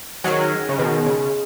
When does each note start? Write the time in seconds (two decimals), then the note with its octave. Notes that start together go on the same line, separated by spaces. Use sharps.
0.24 D#3 F#3 G#3 C#4 G#4
0.69 C#3
0.78 B2 D#3
1.06 C#3